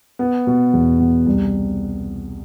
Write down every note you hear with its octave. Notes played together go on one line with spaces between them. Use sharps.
B3
B2
E2
B2
C2